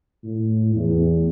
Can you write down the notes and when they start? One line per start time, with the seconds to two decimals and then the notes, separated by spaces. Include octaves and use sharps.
0.24 A2
0.74 E2